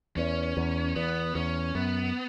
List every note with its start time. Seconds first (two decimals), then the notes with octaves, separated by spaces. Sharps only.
0.17 E2 C#4
0.57 E2
0.96 E2 B3
1.35 E2 C#4
1.75 F#2 B3